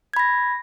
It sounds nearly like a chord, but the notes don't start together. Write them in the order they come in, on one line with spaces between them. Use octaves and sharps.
G#6 B5 A#6